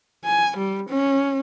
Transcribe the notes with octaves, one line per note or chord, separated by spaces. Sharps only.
G#5
G3
C#4